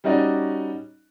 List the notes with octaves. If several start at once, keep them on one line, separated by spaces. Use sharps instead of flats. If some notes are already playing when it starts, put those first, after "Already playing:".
G3 C#4 D#4 F#4 D5 D#5